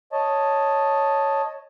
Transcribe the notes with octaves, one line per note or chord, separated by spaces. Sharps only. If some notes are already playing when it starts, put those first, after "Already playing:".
C#5 D#5 A5